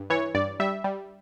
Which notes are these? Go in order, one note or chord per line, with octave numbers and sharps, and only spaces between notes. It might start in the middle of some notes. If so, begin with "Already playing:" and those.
Already playing: G2
E3 C#5
G2 D5
G3 E5
G3